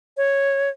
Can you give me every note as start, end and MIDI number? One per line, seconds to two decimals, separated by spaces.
0.17 0.69 73